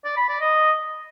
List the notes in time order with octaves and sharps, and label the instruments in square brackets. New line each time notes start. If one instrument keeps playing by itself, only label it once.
[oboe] D5
B5
D5
D#5